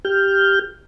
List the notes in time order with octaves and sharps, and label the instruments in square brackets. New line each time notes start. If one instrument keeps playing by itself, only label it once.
[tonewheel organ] G4 F6 G6